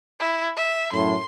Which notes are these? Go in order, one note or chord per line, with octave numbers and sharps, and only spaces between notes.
E4
E5
F#2 A2 C6